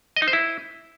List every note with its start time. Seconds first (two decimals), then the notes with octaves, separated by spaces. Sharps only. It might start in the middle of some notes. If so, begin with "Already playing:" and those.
0.16 D#5
0.22 D#4
0.28 C5
0.33 E4